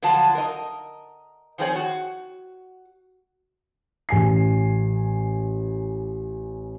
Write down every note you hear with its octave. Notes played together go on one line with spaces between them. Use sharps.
D3 F3 F#3 F4 A5
A#4 D#5
D#3 F3 C4 G#4 C#5
F#4
A1 G#5 C7